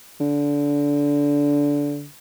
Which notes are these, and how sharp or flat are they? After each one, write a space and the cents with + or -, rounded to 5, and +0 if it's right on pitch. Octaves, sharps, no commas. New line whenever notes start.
D3 -20